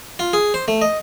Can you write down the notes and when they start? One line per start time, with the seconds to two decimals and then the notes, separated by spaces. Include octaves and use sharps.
0.19 F4
0.33 G#4
0.54 C5
0.68 A3
0.81 D#5